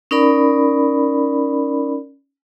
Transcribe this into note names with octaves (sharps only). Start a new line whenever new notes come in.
C#4 D#4 A#4 D5 B5